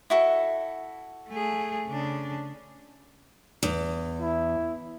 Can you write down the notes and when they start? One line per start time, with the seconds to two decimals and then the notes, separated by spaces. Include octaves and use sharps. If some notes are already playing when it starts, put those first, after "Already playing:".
0.10 E4 F#4 A4
1.29 A3 G#4
1.88 C#3 D4
3.63 E2
4.21 E4